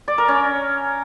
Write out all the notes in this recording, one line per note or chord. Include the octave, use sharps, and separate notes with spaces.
D5
A#4
C#4